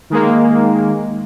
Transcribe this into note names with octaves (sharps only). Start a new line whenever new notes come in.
D#3 G#3 A#3